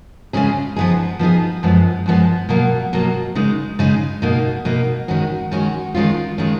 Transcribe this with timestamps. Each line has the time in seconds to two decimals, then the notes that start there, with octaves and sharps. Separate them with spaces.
0.33 C#3 G#3 C#4 G#4
0.76 F3 B3 D#4 G#4
1.19 F3 B3 D#4 G#4
1.63 F#2 F3 G#3 B3
2.06 F#2 F3 G#3 B3
2.49 B2 F#3 A#3
2.93 B2 F#3 A#3
3.35 C#3 G#3 D#4
3.79 C#3 G#3 D#4
4.22 B2 A#3 D#4
4.65 B2 A#3 D#4
5.08 D#3 G#3 C#4 F#4
5.51 D#3 G#3 C#4 F#4
5.94 D#3 G#3 C#4 F4
6.38 D#3 G#3 C#4 F4